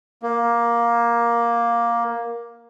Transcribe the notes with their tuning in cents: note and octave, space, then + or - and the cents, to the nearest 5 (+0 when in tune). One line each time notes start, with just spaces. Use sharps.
A#3 +10